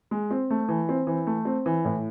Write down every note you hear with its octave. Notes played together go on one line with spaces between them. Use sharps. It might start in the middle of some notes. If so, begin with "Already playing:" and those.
G#3
C4
A3
E3
C4
E3
A3
C4
E3
A2